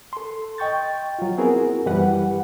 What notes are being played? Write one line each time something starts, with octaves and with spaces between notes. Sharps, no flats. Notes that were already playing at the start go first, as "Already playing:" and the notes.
A4 C6
D#5 G5 C#6 G6 A6
F#3 F4
B3 C4 E4 F#4 G#4 A#4
F#2 E3 G3 G4 B4 F#5